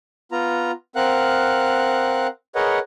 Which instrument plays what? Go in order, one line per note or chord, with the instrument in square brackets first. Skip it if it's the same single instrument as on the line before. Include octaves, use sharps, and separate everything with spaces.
[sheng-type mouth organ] B3 F4 A#5
C4 A#4 F5 F#5 F#6
G#4 A#4 B4 C#5 D#5 F#5